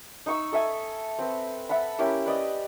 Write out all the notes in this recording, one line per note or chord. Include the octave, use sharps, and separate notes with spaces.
D#4 C#6 E6
A4 E5 G#5
C4 B4
E5 F#5 A5 B5
A#3 C#4 E4 G4
B4 D5 D#5